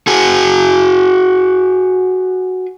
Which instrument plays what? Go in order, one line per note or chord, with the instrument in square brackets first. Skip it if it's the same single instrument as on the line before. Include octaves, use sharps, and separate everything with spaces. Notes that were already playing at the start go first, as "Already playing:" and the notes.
[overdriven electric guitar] F#4 G#4